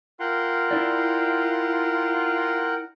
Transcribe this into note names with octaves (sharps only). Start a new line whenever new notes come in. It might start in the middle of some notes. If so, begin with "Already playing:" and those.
F4 A#4 F#5 G5
E4 D5